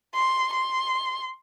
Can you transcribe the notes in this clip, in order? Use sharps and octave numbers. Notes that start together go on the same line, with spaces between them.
C6
C6